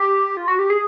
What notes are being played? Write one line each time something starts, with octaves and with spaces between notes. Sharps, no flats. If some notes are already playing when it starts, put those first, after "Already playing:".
Already playing: G4
F4
F#4
G4
G#4